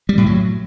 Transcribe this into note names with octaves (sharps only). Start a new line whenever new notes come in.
G3
A2
F#3